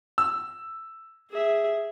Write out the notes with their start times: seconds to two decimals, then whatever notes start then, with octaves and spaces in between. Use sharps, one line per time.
0.18 E6
1.31 G#4 E5